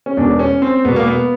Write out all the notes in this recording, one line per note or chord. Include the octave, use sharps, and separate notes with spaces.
C#4
E1 E2 B2 D4
C#4
C4
E1 E2 B2 B3
A#3
B3